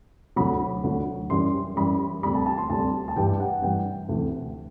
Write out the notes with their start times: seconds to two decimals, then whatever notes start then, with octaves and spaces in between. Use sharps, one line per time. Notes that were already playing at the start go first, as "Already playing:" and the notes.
0.36 D2 D3 F#3 B5
0.84 D2 D3 F#3
1.30 F#2 E3 G3 C6
1.76 F#2 E3 G3 B5
2.23 D2 C3 G3 B5
2.35 A5
2.46 A5
2.58 C6
2.70 D2 C3 G3 A5
3.08 A5
3.16 G2 E3 G3 G5
3.40 F#5
3.62 G2 E3 G3 G5
4.09 D2 C3 E3